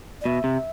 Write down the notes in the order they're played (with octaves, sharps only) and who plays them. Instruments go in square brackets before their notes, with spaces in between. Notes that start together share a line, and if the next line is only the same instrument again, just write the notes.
[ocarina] D5
[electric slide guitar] B2 [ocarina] E5
[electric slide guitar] C3